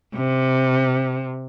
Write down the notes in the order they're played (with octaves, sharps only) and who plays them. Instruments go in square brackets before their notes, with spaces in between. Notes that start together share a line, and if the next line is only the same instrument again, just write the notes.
[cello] C3